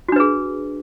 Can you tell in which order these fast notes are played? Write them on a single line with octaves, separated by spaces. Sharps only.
F#4 D4 B4 G#4